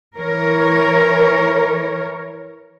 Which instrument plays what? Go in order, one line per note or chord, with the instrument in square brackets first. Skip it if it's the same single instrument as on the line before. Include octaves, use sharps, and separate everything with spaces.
[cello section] E3 A#4 C#5